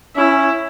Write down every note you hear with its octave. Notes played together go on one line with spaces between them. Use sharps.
C#4 E4